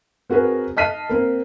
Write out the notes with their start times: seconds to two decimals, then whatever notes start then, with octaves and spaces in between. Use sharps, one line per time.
0.29 C4 F#4 G#4 A#4 B4
0.77 D#5 A5 F6 B6 C7 D#7
1.09 A#3 C4